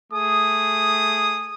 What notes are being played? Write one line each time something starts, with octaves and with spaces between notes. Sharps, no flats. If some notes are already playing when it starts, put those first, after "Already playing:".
A3 G#4 D#6